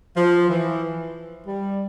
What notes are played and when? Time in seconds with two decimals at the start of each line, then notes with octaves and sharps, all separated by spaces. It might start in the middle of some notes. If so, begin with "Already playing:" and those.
0.16 F3
0.49 E3
1.47 G3